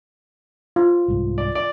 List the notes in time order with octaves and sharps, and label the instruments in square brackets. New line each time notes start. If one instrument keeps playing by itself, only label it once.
[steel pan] F4
[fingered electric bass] C2 G#2
[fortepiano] D5
D5